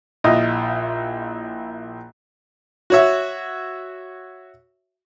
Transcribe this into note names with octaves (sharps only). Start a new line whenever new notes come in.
A#1 E4 F4 D#5
F#4 C#5 E5